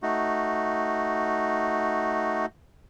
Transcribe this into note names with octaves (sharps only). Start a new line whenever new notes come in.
A3 D#4 F#4